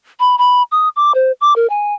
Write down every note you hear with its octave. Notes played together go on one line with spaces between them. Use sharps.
B5
B5
D#6
D6
C5
D6
A#4
G#5